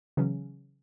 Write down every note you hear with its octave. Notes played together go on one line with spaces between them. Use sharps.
C#3 E3 F#3 C#4